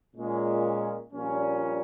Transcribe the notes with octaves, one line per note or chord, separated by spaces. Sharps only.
A#2 G#3 C#4
A#1 A#2 G3 C#4